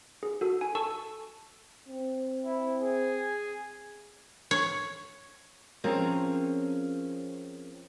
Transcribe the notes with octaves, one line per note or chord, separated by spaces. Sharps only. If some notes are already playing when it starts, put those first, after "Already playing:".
G#4
F#4 A4
G#5
A4 A5 C#6 E6
C4
E4
G#4
C#5
F3 C4 C#4 G#4 A#4 C#5